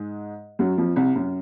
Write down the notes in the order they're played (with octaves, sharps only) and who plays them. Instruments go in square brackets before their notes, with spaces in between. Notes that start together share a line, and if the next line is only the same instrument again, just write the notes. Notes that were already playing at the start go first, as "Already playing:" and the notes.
Already playing: [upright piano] G#2 G#3
F#2 F#3
F2 F3
C2 C3
F#2